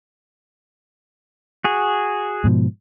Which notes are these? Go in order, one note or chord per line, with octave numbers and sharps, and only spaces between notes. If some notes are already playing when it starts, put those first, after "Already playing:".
F#4 G#4
G#2 B2 F3